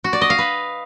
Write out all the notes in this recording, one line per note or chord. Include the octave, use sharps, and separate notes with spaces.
F#4
D5
D#5
F5
B4